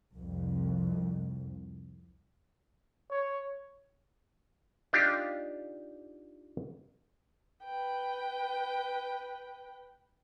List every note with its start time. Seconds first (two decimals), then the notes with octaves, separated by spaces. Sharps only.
0.17 C2 F2
3.10 C#5
4.93 D4 D#4 F4 G4
7.64 B4 G5